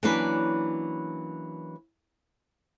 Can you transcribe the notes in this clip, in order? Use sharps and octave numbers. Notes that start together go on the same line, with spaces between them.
E3 F#3 A#3 C#4 D4 B4